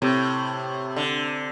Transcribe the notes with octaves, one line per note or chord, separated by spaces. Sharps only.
A2 C3
D3